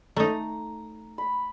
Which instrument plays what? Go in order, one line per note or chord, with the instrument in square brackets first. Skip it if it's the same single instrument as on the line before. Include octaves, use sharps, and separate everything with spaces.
[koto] A3 D#4 [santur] A#5
[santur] B5